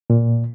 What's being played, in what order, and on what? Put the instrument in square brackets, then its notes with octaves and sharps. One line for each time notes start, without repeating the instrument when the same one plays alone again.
[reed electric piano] A#2